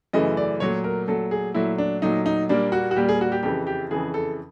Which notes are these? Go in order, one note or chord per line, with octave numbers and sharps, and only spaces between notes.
F#2 C#3 E3 A3 D#5
D5
A#2 F#3 A3 C#5
A#4
A#2 F#3 A3 A4
G#4
A#2 F#3 A3 E4
D4
A#2 F#3 A3 D#4
D#4
A#2 G3 A#3 D4
F#4
F#4
A#2 G3 A#3 G4
G#4
F#4
G4
F2 C#3 E3 G4
G4
F2 C#3 E3 G#4
A4